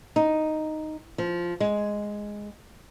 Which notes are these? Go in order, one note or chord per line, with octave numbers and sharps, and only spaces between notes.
D#4
F3
G#3